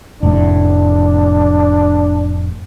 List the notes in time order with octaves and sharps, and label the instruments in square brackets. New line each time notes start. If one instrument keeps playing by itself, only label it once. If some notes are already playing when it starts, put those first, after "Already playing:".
[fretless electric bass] F1 A2 [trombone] D4